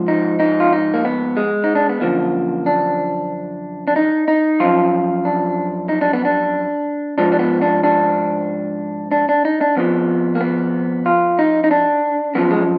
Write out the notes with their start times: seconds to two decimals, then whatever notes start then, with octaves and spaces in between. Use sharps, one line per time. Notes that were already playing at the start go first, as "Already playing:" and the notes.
Already playing: G#2 F3
0.08 D#4
0.40 D#4
0.60 F4
0.73 D#4
0.94 A#3
1.05 B3
1.37 G#3
1.64 D#4
1.75 D4
1.89 B3
2.01 F#2 D3 F3 A#3
2.66 D4
3.88 D4
3.96 D#4
4.28 D#4
4.60 F#2 F3 F4
5.25 D4
5.89 D#4
6.01 D4
6.13 B3
6.25 D4
7.18 G#2 F3 D4
7.32 D4
7.39 B3
7.62 D4
7.84 D4
9.12 D4
9.29 D4
9.45 D#4
9.61 D4
9.77 F2 F3 B3
10.35 A#3
10.41 B3
11.06 F4
11.39 D#4
11.64 D#4
11.71 D4
12.35 F#2 F3 B3
12.51 G#3